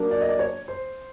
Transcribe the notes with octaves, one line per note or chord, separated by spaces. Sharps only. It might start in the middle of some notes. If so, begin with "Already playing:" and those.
Already playing: F#3 A#3 D4
D5
D#5
D5
C#5
C5